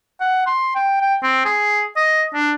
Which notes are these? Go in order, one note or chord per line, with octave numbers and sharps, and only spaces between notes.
F#5
C6
G5
G5
C4
G#4
D#5
D4